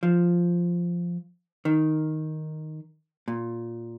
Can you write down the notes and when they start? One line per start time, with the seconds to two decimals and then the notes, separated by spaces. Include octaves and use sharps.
0.03 F3
1.65 D#3
3.28 A#2